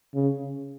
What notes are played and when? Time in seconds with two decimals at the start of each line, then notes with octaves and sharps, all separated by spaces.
0.14 C#3